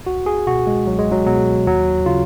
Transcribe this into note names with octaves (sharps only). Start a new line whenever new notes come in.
C#2 F#4
G#4
B2 F#4
G#3
C#2 F#3
G#3
F#3
B2 F#3
D#2 F#3
C#3 F4